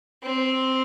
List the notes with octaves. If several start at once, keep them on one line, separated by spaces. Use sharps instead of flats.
C4